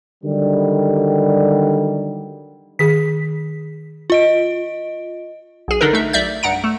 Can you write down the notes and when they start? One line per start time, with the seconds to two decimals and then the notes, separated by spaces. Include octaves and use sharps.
0.23 D3 D#3 F#3 G3
2.79 D#3 G#4 B6
4.10 F4 D#5 D7
5.68 B1 G#4
5.81 D3 D4 D#4 A4 A#4
5.93 A3 D#4 E5
6.13 B1 D5 E5 G6
6.43 G2 F#5 A#5 D7
6.64 A3